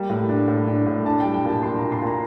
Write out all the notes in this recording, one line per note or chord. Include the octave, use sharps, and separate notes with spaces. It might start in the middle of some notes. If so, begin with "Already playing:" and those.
Already playing: G3 A#3
A2
D4
A2
D4
A2
D4 A5
G3 G5
G5
A#2 A5
D4 C6
A#2 A#5
C6
A#2
A#5